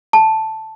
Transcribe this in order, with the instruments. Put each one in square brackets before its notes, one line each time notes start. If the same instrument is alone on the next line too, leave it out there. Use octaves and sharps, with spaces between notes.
[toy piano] A5